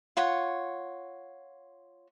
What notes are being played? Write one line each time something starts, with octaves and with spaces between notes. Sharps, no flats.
F4 C#5 F#5